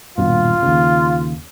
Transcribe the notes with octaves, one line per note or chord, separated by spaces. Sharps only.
D#1 G2 B2 F4
D#2 C#3